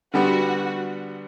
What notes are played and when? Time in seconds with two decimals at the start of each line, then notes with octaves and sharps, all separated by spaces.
0.14 D3 G3 B3 F#4